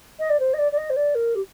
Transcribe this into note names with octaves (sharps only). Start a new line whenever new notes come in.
D#5
D5
C5
D#5
D5
D5
D#5
C5
D5
A#4
G4